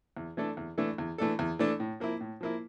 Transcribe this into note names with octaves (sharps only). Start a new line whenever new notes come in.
E2
E3 A3 D4 A4
E2
E3 A3 D4 A4
E2
E3 A3 D4 A4
E2
E3 A3 D4 A4
A2
F3 A#3 E4
A2
F3 A#3 E4